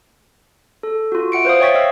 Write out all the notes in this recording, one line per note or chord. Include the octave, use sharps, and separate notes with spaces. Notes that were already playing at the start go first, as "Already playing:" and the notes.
A4
F4 F#4
E5 F#5 C#7 D7
B4 C5 F5 D#6
C#5 E5 G5 C#6 A6 B6
D#5 F5 E6